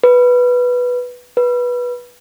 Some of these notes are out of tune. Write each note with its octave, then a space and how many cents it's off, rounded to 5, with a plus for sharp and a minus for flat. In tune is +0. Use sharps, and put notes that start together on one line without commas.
B4 -5
B4 -15